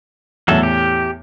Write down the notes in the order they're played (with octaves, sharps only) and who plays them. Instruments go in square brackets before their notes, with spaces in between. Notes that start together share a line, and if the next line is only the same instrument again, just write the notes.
[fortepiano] E2 A2 [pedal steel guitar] F#3 A4
[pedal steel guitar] G4